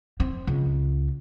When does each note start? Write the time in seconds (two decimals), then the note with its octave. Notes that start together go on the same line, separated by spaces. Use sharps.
0.20 C4
0.47 C#2